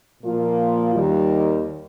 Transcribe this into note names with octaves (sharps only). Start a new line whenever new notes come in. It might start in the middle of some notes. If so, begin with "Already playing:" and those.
A#2 F3 A#3 F4
D#2 D#3 G3